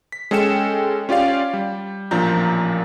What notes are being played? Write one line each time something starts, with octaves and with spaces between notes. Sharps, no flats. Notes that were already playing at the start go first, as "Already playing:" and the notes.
B6
G#3 C#4 A4 G5 C#7 E7
C#4 F4 G4 D5 F5
G3
A1 A#2 F3 D4 A#5 G6